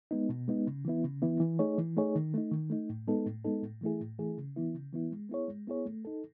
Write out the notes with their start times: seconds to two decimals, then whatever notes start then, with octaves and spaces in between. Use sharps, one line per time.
0.11 G#3 B3 D#4
0.29 B2
0.48 G#3 B3 D#4
0.67 C#3
0.85 E3 B3 E4
1.04 C#3
1.22 E3 B3 E4
1.40 E3
1.59 A3 D#4 G#4 C#5
1.78 E3
1.97 A3 D#4 G#4 C#5
2.15 D#3
2.34 A3 D#4
2.52 D#3
2.70 A3 D#4
2.90 A2
3.07 G#3 B3 D#4 A4
3.26 A2
3.44 G#3 B3 D#4 A4
3.63 A2
3.81 E3 A3 E4 G#4
4.00 A2
4.19 E3 A3 E4 G#4
4.38 C#3
4.56 E3 B3 E4
4.75 C#3
4.93 E3 B3 E4
5.12 G#3
5.29 B3 E4 G#4 C#5
5.48 G#3
5.68 B3 E4 G#4 C#5
5.86 A3
6.05 D#4 A4